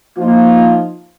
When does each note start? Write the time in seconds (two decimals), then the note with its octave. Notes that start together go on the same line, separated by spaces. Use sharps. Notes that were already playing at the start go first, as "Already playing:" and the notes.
0.18 F3 A#3 D#4 F4